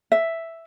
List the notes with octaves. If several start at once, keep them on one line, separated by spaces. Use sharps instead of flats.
E5